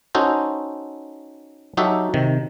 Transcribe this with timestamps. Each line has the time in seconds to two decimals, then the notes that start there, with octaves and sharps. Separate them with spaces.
0.15 C#4 D#4 F#4 A4 C5
1.77 F#3 D#4 F#4 G4 A4 E5
2.14 C3 D#3